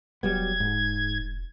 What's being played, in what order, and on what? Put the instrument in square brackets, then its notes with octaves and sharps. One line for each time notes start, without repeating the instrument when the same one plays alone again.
[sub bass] E1 [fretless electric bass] F#3 G3 B3 [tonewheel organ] G#6
[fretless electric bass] G#2